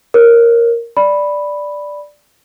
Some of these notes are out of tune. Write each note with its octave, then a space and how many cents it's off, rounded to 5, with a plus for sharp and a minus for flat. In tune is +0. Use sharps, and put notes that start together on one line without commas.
A#4 +0 C#5 -30
D5 +0 B5 +0